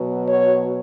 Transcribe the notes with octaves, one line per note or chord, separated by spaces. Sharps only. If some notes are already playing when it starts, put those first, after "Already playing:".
Already playing: B2 F#3
C#5